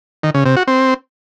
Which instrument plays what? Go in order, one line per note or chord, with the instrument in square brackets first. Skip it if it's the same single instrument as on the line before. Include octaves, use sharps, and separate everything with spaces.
[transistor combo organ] D#3
C#3
C3
F#4
C4